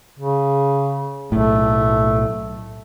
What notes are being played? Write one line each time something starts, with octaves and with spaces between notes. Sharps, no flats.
C#3
B1 A2 A3